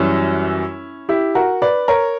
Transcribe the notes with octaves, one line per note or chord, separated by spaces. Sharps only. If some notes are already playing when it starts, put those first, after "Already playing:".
Already playing: F#2 E3 G3 C#4 E4
E4 G4
F#4 A#4
B4 D5
A#4 C#5